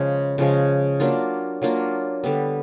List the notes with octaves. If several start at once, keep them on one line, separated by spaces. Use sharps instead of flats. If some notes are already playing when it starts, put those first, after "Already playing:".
Already playing: C#3 F3 G#3
C#3 F3 G#3
F#3 A#3 D4 F4
F#3 A#3 D4 F4
D3 G3 B3